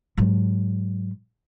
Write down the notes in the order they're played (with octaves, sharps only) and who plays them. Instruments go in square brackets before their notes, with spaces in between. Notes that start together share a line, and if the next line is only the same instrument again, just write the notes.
[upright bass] G#2 F#3